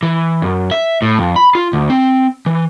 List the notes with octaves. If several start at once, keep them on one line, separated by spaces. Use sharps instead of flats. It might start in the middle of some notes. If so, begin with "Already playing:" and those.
E3
F#2
E5
A2
F2
B5
F4
D2
C4
E3